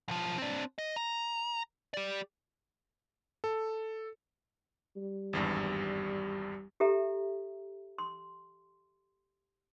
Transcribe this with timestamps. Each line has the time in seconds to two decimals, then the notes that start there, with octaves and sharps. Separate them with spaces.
0.08 B1 F3
0.38 C4 D4
0.78 D#5
0.96 A#5
1.94 G4 D5
3.44 A4
4.96 G3
5.33 G#1 E2 G2
6.80 G4 A4 E5 A#5
7.98 C6